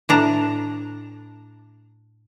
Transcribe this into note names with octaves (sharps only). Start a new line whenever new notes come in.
A2 D4 A#5